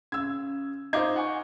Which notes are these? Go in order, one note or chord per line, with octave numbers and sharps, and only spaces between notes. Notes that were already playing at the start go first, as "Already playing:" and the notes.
C#3 E6 G#6
D#4 F4 C5 D6 G#6
F#5 G#5 C#6